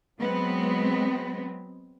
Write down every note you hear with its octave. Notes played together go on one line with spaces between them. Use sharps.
F#3 G#3 B3 C4